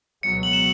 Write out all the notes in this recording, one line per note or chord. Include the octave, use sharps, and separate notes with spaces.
C#2 B2 F#3 B3 C#7
F#7
E7